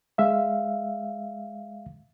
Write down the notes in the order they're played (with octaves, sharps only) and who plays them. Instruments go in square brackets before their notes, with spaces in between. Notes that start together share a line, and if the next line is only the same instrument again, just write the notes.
[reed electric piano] G#3 E5 F5